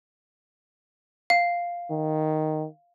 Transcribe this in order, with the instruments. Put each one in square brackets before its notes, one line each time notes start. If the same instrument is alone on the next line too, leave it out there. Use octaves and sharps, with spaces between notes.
[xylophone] F5
[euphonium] D#3